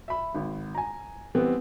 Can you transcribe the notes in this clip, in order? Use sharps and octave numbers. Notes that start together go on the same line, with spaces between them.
E5 B5
G#1
G#5 A#5
E3 G3 B3 C4